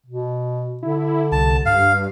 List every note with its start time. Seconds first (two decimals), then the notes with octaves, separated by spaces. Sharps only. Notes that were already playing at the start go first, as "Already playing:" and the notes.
0.06 B2
0.83 D3 E4
1.32 C2 A5
1.66 G2 F5